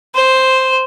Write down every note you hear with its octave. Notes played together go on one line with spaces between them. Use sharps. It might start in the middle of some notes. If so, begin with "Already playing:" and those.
C5